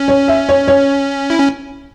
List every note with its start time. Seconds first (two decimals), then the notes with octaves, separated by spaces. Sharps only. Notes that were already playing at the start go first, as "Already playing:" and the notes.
Already playing: C#4
0.08 C#5
0.28 E5
0.49 C#5
0.68 C#5
1.30 E4
1.39 C#4